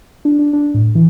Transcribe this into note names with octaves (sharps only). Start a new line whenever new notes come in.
D4
D4
D4
A2
E3